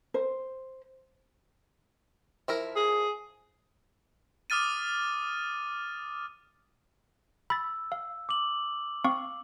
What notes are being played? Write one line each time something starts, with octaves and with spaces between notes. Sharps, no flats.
C5
F3 E4 A#4
G#4
D6 D#6 F6 A6 D#7
B5 E6 A6
F5
D6 F#7
C4 F5 C#6